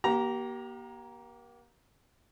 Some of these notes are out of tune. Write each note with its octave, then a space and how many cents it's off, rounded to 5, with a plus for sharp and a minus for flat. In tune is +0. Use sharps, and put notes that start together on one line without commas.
A#3 +35 G4 -25 A#5 +10